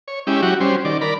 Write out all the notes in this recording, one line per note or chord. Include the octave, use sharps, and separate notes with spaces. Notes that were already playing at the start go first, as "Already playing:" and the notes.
C#5
G#3 C#4 E4 G4
F#3 F#4 G4
G3 C#4 C5
D#3 D5
A#4 D5 B5